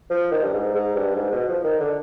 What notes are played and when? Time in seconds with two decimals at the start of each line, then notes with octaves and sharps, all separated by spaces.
0.10 F3
0.31 D#3
0.43 G2
0.53 G#2
0.75 G#2
0.95 G2
1.16 G#2
1.32 B2
1.48 F3
1.64 D#3
1.80 D3